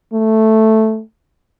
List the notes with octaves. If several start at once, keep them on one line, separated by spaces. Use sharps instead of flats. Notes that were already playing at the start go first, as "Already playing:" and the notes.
A3